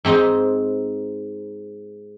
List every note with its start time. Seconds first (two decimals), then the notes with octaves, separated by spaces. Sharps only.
0.05 G#2 C4 D#4 D#5